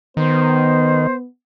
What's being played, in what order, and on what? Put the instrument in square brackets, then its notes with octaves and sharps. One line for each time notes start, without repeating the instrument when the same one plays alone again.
[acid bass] D#3 [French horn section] B3 [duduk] C5